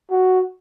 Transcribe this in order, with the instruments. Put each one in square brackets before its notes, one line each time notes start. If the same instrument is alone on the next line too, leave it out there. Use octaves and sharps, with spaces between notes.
[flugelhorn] F#4